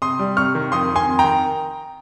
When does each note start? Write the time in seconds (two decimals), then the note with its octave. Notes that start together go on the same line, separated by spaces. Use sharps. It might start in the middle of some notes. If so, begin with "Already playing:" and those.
0.02 C3 C6 D#6
0.19 G3
0.37 C3 C#6 F6
0.55 D#3
0.72 F2 C6 D#6
0.90 D#3
0.96 G#5 C6
1.07 F2
1.19 G5 A#5
1.24 D#3